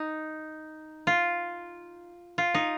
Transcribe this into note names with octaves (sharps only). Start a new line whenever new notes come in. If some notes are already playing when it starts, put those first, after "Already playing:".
Already playing: D#4
F4
F4
D#4